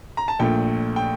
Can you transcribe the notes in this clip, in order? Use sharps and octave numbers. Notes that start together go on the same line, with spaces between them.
A#5
A5
A#1 A#2 A3 G5
G5